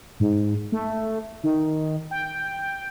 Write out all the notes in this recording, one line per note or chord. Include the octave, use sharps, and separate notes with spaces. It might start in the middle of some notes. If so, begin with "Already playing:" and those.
G#2
A3
D#3
G5